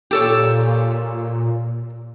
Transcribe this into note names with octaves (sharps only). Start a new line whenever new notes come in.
A#2 G4 A4 C#5